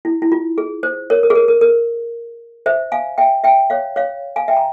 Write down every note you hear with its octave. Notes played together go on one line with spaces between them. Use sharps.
E4
E4
F4
G#4
C5
A#4 C#5
A#4
G#4
A#4
A#4
A#4
C5 E5
F5 G#5
E5 G5
E5 G5
C#5 F5
C#5 F5
F5 G#5
E5 G5
A#5